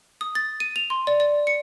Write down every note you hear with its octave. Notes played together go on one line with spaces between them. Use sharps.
D#6
A6
D#7
F7
C6
D5
D5
C#7